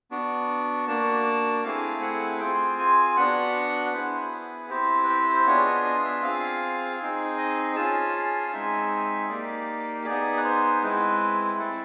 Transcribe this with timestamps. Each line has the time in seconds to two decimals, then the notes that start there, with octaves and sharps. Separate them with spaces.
0.11 B3 D4 F#4
0.87 A#3 D4 F#4 A5
1.64 A3 C4 E4 G#4 F5
2.02 F#5
2.40 C4 F4 G#4 G5
2.79 G#5
3.17 B3 D4 F#4 F#5
3.94 B3 E4 G#4 C5
4.32 B4
4.70 C4 E4 G4 C5
5.03 B4
5.09 C5
5.36 C5
5.46 B3 D4 F4 G#4 C#5
5.65 D#5
5.85 D#5
5.98 F5
6.04 E5
6.23 C4 F4 G#4 F5
6.99 C4 D#4 G#4
7.38 D#5
7.76 C#4 F4 G#4 A5
8.52 G#3 C4 D#4 G#4 E5
9.29 A#3 D#4 G4 D5
10.05 B3 D#4 G#4 D5
10.37 B4
10.44 C5
10.82 G#3 C4 E4 B4
11.59 A3 C4 E4 A4